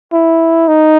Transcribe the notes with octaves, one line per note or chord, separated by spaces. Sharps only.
E4
D#4